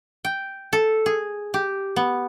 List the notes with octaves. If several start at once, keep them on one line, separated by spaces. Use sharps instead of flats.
G5
A4
G#4
G4
B3